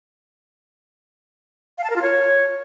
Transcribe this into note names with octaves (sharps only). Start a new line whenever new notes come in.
F5
A5
A#4
F4
C#5